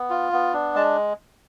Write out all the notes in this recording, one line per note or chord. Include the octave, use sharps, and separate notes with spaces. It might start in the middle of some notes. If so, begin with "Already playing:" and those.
Already playing: B3
F4
B3
D4
G#3 A5